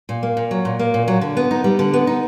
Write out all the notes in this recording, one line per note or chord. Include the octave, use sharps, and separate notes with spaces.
A#2
A#3
A#2
F#3
A#2
A#3
A#2
F#3
D3
B3
D#4
G3
D3
B3
D#4